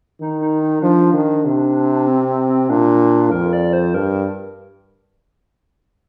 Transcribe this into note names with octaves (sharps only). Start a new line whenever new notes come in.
D#3 D#4
D#4
D#4
F3 D4
D#3
C3
C4
C4
C4
A#2 D4
F2 A#4
D5
C5
G2 A#4